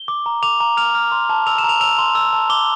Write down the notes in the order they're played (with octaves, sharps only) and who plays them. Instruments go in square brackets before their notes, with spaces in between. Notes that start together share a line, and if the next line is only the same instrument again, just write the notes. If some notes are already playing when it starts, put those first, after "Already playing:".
Already playing: [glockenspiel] G7
D6
A#5
D6 F7
A#5
F6 F7
F6
C6
A5
E6 F7
E7
A#5
F7
E6 F7
C6
E6
A5
D6 G7